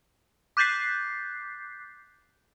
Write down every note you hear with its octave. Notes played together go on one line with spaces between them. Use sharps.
D6 F#6 G6 A6 B6 C7